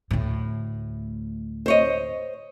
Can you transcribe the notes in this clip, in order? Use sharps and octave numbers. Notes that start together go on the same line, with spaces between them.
D2 A2
C5 C#5 D#5